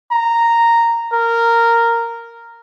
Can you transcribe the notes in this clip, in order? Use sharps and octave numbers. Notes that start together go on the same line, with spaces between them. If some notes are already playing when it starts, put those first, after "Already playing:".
A#5
A#4